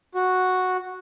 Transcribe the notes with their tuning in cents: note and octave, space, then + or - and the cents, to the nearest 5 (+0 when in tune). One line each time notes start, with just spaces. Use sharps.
F#4 -5